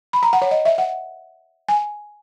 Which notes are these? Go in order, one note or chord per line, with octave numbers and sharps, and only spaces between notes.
B5
A#5
F#5
C#5
D#5
E5
F#5
G#5